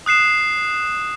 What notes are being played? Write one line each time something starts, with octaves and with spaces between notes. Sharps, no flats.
D#6 F#6 C7 E7